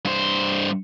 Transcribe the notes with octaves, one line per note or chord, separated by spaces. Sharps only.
G2 C5